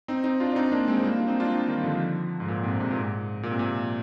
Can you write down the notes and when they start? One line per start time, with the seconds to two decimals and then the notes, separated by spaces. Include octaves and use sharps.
0.08 C4 D#4
0.24 C4 D#4
0.40 D4 F4
0.51 D4
0.56 C4 D#4
0.72 A#3 D4
0.88 G#3 C4
0.99 G#3
1.04 G3 A#3
1.16 D4 F4
1.28 C4 D#4
1.40 D4 F4
1.52 C4 D#4
1.68 D#3 G3
1.83 D3 F3
2.40 G#2
2.48 A#2
2.63 G#2 C3
2.79 G#2 C3
2.91 A#2
2.96 G#2
3.43 A#2
3.51 C3
3.59 A#2